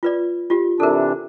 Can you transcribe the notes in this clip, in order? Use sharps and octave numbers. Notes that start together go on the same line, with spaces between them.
F4 B4 D5
F4 G4
C3 E3 D4 A4 A#4